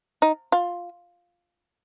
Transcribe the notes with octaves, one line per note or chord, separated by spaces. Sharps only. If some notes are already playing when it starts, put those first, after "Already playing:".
D#4
F4